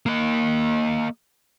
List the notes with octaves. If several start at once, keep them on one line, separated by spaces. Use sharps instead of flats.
A#3 D#5